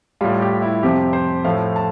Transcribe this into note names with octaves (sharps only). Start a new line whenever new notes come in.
A2 G3 F4
G4
E4
F2 C3 F3 G4
C5
A2 F3 A3 F5
A5